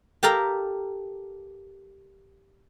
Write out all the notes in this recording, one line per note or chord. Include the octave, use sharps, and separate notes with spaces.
G4 A4 A#4 F5 A#5